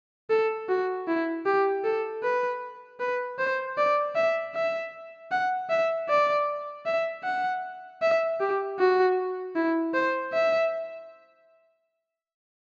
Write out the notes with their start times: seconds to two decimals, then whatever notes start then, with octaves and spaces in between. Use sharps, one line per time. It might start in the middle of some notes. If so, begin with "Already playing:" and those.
0.30 A4
0.69 F#4
1.08 E4
1.46 G4
1.84 A4
2.23 B4
3.00 B4
3.38 C5
3.77 D5
4.15 E5
4.55 E5
5.31 F#5
5.70 E5
6.09 D5
6.86 E5
7.24 F#5
8.02 E5
8.40 G4
8.79 F#4
9.56 E4
9.94 C5
10.33 E5